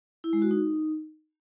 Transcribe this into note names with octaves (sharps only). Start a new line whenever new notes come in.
E4
G#3
F#4
D#4